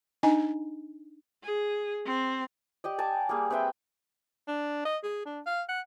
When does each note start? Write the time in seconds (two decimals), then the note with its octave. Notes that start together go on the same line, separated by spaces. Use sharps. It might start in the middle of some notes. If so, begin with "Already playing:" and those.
0.23 D4 D#4 D#5 G#5
1.43 G#4
2.06 C4
2.84 G4 D5 D#5
2.98 G#5 A5 D6
3.29 G3 A#3 G#4
3.50 C4 B4 E5 G5
4.47 D4
4.85 D#5
5.03 G#4
5.25 D4
5.46 F5
5.69 F#5